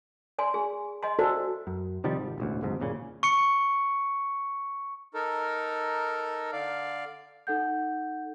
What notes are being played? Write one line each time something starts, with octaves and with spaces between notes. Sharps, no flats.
D5 G#5 C6
G#4
D#5 G#5 C6
F#4 A4 C5 D5
F#2
C3 D#3 F3 G3
G#1
E1 A1 D2
F#1 D#2 G#2 C3
F#1 D#2 A#2 C#3
C#6 C#7
D#4 A4 A#4
D3 D5 F5
D#4 A4 F#5 G6